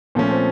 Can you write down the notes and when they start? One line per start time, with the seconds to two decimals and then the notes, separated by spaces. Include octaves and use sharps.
0.15 A#2 F3 A3 B3 C#4
0.30 C4